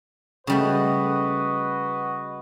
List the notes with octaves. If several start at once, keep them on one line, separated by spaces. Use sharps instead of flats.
C#3 G3 A3 F#4 B4 D#5